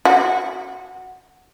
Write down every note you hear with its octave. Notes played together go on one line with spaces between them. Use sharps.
F#4